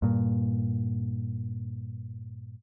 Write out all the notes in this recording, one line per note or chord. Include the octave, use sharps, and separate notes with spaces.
G2 A#2